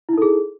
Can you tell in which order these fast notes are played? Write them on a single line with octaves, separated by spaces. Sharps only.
E4 D#4 A4 G#4